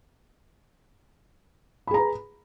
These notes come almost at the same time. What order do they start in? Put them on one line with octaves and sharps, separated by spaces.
B5 G#4 A#5 B4